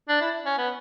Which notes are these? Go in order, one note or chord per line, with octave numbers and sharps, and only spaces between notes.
D4
E4
C#4
B3